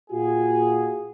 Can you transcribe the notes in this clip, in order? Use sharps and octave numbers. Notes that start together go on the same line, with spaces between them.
A#2 F4 F#4 G#4